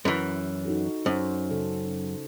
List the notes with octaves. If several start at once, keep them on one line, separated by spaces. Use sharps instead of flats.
F#2 E3
D#4 F#4 A4
F#2 C5
C#3 A4